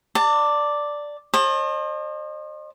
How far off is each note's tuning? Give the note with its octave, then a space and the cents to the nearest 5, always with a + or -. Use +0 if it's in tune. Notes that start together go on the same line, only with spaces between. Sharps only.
D5 +0 A5 +35
C5 +40 D#5 -35 A5 +0